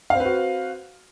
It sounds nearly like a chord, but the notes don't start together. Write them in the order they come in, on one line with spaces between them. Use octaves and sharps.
F5 C4 B4 F#4